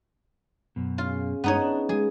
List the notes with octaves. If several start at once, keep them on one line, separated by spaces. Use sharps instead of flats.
F#2 B2
C#3 F4
G2 G#3 B3 D#4 C#5 A#5
D4
G3 G#3 G#4